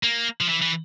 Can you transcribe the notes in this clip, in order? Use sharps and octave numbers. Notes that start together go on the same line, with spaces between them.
A#3
F3
E3
E3